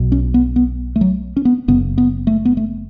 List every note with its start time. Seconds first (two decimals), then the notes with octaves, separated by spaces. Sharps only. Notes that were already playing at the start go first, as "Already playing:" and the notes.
Already playing: B1 B2
0.12 C#4
0.34 B3
0.56 B3
0.96 A3
1.01 F#3
1.37 C#4
1.45 B3
1.68 F#1 F#2 C#3 B3
1.98 B3
2.27 A3
2.45 B3
2.57 A3